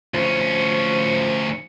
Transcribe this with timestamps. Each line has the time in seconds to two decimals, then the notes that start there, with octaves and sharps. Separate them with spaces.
0.14 D2 F3 C#4